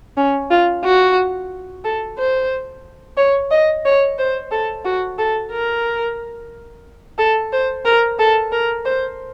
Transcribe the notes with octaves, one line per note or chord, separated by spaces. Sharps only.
C#4
F4
F#4
A4
C5
C#5
D#5
C#5
C5
A4
F#4
A4
A#4
A4
C5
A#4
A4
A#4
C5